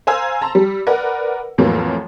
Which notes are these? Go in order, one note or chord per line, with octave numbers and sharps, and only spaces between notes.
C5 F5 G#5 A#5 E6
A5 A#5 C6
G3
A#4 B4 D5 F#5
F2 A2 E3 F#3 A#3